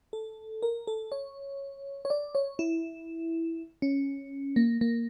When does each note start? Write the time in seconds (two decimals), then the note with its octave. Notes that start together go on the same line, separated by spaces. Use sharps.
0.13 A4
0.62 A#4
0.87 A4
1.12 C#5
2.05 C#5
2.10 D5
2.35 C#5
2.59 E4
3.82 C#4
4.56 A#3
4.81 A#3